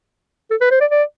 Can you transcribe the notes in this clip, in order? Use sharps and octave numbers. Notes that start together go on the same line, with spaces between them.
A4
B4
C5
D5
D5